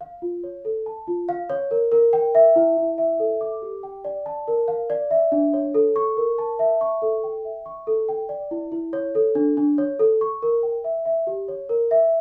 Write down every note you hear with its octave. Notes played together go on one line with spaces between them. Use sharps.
F5
F4
C#5
A4
A5
F4
F5
C#5
A#4
A#4
G5
E5
E4
E4
E5
A4
D6
G4
G5
D5
A5
A#4
F5
D5
E5
D4
C#5
A4
C#6
A#4
A5
E5
C#6
A4
G5
E5
C#6
A4
G5
D5
E4
E4
C#5
A4
D4
D4
C#5
A4
C#6
A#4
G5
E5
E5
G4
C#5
A#4
E5